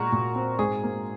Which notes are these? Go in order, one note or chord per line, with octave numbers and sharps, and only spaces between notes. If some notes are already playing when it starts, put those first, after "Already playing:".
Already playing: A#2 G#3 F#4 A#4
A#2
C4
G#2 G#4
A#3